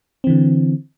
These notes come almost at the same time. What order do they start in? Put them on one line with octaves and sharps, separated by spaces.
C4 E3 D3